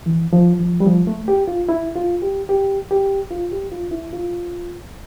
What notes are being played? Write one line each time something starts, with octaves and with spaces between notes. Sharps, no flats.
E3
F3
F3
G3
F3
A3
G4
F4
E4
F4
G4
G4
G4
F4
G4
F4
E4
F4